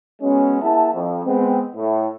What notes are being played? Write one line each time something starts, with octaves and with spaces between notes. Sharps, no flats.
F#3 G#3 B3 C#4
A#3 E4 G#4 E5 F#5 A5
F2
G#3 B3 C4
A2